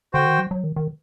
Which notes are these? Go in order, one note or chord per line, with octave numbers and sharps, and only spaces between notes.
D3 F#4 C5 G5
D#3
F#3
F#3
D#3
D#3